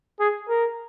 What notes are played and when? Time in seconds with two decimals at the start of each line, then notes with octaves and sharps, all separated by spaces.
0.20 G#4
0.49 A#4